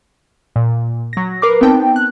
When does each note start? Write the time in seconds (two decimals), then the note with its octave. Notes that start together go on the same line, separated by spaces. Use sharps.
0.56 A#2
1.13 F#3 A#6
1.42 A#4 B4 D6 C7
1.61 B3 C4 D#4 G5 A5
1.96 F#6